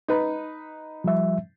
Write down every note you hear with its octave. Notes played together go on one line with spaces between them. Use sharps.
D#4 B4
F3 G3 E5